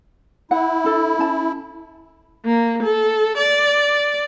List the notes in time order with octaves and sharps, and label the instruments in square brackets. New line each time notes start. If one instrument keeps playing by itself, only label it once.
[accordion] E4 [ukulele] F#5
[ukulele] D4 A4
C#4 A5
[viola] A#3
A4
D5